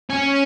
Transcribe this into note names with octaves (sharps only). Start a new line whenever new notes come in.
C#4